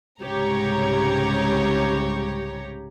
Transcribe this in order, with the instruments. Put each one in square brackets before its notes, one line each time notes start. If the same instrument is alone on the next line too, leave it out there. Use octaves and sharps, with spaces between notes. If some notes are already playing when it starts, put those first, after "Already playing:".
[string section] C2 G#2 C#3 G4 C#5 A#5